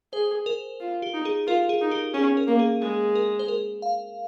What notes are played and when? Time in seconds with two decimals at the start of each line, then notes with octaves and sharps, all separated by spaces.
0.13 G#4 C5
0.46 A#4
0.80 F4
1.02 G4
1.14 D#4
1.25 G#4
1.47 F4 A#4
1.69 G#4
1.81 D#4
1.91 G4
2.14 C#4 G#4
2.37 A#4
2.47 A#3
2.59 G#4
2.82 G#3 G#4
3.15 A#4
3.39 C5
3.48 A#4
3.82 F5